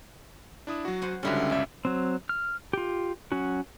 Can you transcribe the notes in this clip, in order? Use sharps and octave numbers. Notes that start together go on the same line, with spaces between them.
D4 E4 D#6
F#3 F#4
C5 F#5 G#5
C#2 D3 G3 C#4 E4 F#4
G1 C#2 D5 E5
F#3 C4
F6
F4 G4
F#3 C#4 F#4